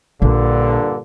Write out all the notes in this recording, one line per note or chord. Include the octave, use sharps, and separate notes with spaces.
A#1 G2 A#2 D3